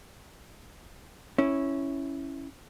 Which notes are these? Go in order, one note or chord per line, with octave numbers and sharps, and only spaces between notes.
C#4 E4